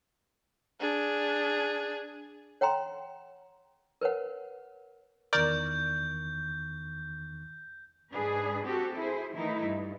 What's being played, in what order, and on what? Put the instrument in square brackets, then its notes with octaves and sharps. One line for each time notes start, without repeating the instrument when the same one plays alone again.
[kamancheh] D4 G#4
[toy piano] C#5 F#5 G5 A#5 C6
A#4 B4 C#5 F#5
[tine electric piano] E2 D#3 C#6 [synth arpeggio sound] A#4 D5 [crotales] G6
[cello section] G#2 D4 G#4 B4
C4 F#4 G4 A4
E4 G#4 C5
D#3 E3 A3 D#4 E4
G2